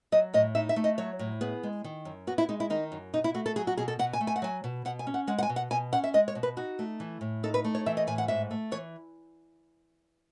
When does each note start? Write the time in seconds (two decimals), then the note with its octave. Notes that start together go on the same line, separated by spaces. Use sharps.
0.12 F#3 D#5
0.34 A2 D#5
0.55 D#4 E5
0.69 E5
0.76 A3
0.84 D#5
0.98 F#3 C#5
1.19 A2
1.41 B3 G#4
1.63 G#3
1.84 D#3
2.05 F#2
2.27 B3 F#4
2.38 E4
2.49 G#3 D#4
2.60 E4
2.70 D#3 D#4
2.92 F#2
3.13 B2 D#4
3.24 E4
3.34 A3 F#4
3.46 A4
3.56 F#3 G#4
3.67 F#4
3.77 B2 G#4
3.88 A4
3.99 B2 F#5
4.13 G#5
4.21 A3
4.27 G#5
4.36 F#5
4.42 F#3 G#5
4.64 B2
4.85 B2 F#5
4.99 G#5
5.07 C#4
5.14 F#5
5.27 G#3 F#5
5.39 F#5
5.43 G#5
5.49 B2
5.56 F#5
5.71 B2 G#5
5.92 C#4 F#5
6.04 E5
6.14 G#3 D#5
6.28 C#5
6.35 B2
6.43 B4
6.57 D#4 F#4
6.79 A3
7.00 E3
7.21 A2
7.43 D#4 A4
7.54 B4
7.65 A3
7.75 C#5
7.86 E3 E5
7.97 D#5
8.07 A2 G#5
8.18 F#5
8.28 G#2 E5
8.51 A3
8.72 E3 C#5